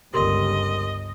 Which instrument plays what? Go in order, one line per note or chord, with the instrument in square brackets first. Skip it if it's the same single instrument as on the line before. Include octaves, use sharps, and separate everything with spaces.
[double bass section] G1 C#2 [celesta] G4 A#4 C6 [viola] D#5